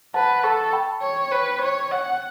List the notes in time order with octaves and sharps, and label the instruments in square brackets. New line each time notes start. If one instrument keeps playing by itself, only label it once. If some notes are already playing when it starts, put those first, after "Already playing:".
[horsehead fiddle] B4 [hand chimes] F#5 A5
[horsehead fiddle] A4 [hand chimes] A5 C#6
[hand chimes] G5 B5
[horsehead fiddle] C#5
B4
C#5
F#5